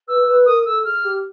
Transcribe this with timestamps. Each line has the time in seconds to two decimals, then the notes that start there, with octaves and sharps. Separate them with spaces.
0.08 B4 E6
0.27 B4
0.46 A#4 D#6
0.66 A4 E6
0.85 G#4 F6
1.04 G4